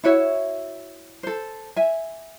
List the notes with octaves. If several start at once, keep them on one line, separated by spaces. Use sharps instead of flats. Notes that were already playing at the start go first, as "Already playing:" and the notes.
E4 F#4 C#5 E5
A4 C5
E5 G#5